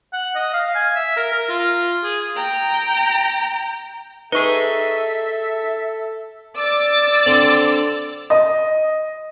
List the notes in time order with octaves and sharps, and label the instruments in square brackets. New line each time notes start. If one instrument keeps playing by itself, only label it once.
[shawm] F#5
D#5
F5
G#5
E5
A#4
A#4
F4
G#4
[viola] G5 A#5
[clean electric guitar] D#4 G#4 [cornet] A4 [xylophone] B4 C#6 [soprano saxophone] E5
[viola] D5 [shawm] D6 [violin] E6 A6
[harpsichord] D3 C4 D4
[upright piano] D#5